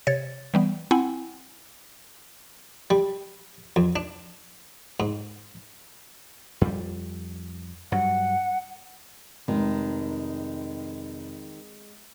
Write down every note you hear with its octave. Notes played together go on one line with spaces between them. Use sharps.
C3 C#5 A6
E3 G3 B3
C4 E4 F#5 G#5
G3
F2
D4
G#2
F2 G3
G2 F#3 F#5
F1 D#3 G#3